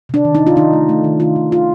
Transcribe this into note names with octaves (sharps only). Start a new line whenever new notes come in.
C3 D4
D#3
D#4
C3
F4
D#3 D#4
A3
A3
D#3
D#3 F4
D#3
D#3 F4